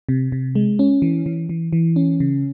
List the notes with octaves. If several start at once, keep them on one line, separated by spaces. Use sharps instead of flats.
C3
C3
G#3
C#4
E3
E3
E3
E3
C#4
C#3